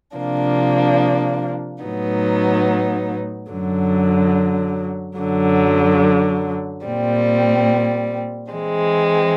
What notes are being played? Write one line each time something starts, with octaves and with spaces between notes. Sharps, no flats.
C3 F3 A#3 D4
A2 F#3 B3 D#4
F#2 D3 F#3
F#2 D3 F#3
A#2 G3 C4
E3 G#3 C4